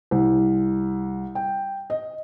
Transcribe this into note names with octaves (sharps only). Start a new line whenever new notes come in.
C2
G5
D#5